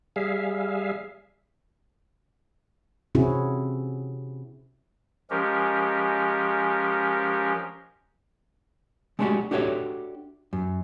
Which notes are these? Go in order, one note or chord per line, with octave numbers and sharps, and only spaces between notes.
G3 G#4 E5 F5
C3 C4 C#4 E4 F#4 G#4
F3 G#3 C#4 G4 A#4
G#3 A3 D4 D#4 F#4 G4
D4 F#4 G4 A4 C#5 E5
F#2